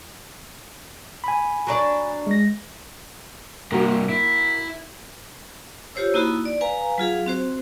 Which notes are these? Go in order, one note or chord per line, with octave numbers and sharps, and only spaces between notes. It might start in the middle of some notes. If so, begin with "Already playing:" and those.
G#5 B5
F#3 D4 D5
G#3 A#6
G2 C3 A#3 F#4
E4
F4 G4 C5 C#5 E6
A#3 D#4 E4 F#4 B5
D5
B4 F5 G#5 A#5
F#3 F4 G#4 F5
C4 F#4 C5